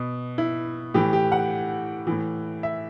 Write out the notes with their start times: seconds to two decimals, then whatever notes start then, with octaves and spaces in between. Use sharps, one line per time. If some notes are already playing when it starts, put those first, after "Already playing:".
Already playing: B2
0.38 E4
0.94 A2 E3 G4
1.13 G4
1.32 F#5
2.07 A2 E3
2.63 E5